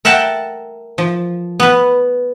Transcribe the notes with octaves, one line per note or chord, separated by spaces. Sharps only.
A#4 E5 F#5 G5 A5
F3
B3 B4